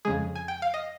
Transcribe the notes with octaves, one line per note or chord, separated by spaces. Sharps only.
F2 C#3 G#3 G#4
G#5
G5
F5
D#5